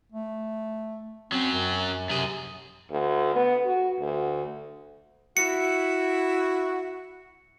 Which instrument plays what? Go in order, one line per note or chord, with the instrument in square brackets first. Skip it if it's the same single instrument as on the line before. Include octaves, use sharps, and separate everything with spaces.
[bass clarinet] A3
[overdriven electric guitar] F#3 C#4 [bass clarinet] C4
[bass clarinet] F#2
[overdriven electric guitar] F#2 G#4 [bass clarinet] C3
[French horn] D2
B3
F#4
D2
[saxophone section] E4 F#4 [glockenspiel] C#7